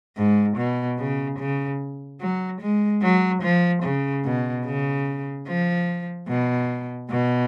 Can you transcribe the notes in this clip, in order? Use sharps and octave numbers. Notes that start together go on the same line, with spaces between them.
G#2
B2
C#3
C#3
F#3
G#3
F#3
F3
C#3
B2
C#3
F3
B2
B2